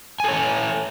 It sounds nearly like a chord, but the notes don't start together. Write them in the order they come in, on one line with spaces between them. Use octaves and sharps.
G#5 A4 C#5